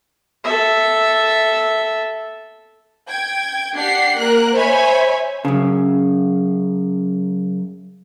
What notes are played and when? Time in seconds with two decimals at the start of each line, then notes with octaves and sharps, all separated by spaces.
0.45 A4 E5
3.09 G5 G#6
3.75 D4 G4 F#5 C7
4.18 A#3 A#4 F#6
4.55 C5 C#5 E5 G#5 B5
5.45 F#2 C#3